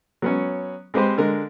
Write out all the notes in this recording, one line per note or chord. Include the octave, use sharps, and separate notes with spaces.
F#3 B3 C#4
G#3 C4 G4 B4 C5
D3 G#3 A#4